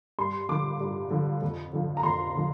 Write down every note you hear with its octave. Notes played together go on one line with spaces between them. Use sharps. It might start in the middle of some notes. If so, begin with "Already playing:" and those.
G2 C6
D3 F3 D6
G2
D3 F3
F2
D3 F3
A#5
F2 C6
D3 F3